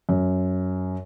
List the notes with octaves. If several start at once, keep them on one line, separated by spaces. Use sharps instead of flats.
F#2